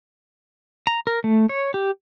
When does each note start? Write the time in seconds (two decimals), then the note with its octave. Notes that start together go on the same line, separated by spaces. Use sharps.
0.87 A#5
1.07 A#4
1.24 A3
1.49 C#5
1.74 G4